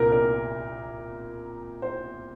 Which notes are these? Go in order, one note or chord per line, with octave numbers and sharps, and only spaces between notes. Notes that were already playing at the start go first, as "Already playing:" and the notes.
Already playing: C2 A#2 A#4
A#4
C5